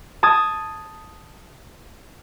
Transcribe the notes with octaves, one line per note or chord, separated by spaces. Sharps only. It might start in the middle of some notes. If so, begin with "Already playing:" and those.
A5 D#6 G#6